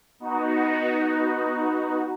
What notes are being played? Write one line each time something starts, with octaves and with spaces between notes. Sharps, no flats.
B3 D#4 F#4